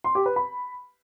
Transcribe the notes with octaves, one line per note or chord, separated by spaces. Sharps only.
C6
G4
B4
B5